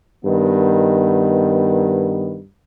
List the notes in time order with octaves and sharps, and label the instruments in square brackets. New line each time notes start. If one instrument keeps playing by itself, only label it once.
[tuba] G2 [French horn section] D#3 B3